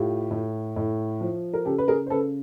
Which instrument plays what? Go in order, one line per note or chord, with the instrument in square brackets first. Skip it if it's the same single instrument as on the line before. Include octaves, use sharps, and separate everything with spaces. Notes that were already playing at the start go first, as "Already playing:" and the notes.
Already playing: [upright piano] A2 F4 G4
A2
A2
F3
A#4
C#3 G4 A4
B4
G#4 A#4
C5
C#3 A4 B4